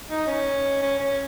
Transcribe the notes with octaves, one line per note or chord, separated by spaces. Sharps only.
D#4
C#4
C#4
C#4